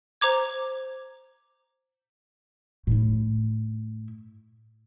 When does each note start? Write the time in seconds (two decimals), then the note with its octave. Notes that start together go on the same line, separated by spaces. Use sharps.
0.21 C5 A#5 D6 G#6
2.87 A2 E4